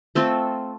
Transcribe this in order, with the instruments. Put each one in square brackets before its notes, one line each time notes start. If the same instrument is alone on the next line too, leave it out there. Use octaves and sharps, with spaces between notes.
[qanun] A3 C4 F4 A4